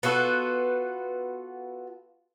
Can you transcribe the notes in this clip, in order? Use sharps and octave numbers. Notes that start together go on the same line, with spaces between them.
B3 F4 F#4 A4